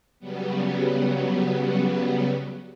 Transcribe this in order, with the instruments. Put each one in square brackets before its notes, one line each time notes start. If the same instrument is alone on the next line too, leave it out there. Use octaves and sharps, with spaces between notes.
[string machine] C#3 F#3 G3 B3